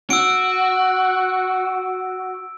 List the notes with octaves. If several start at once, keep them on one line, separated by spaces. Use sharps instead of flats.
F#4 E6 D7